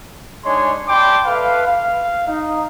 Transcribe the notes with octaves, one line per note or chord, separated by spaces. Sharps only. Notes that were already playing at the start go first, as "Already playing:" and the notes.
G#3 D4 D#4 C#5 G#5 C6
D5 G5 A5 B5 C6 D6
A4 B4 E5 F5
F5
D#4